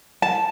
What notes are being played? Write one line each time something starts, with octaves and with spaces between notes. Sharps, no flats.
A5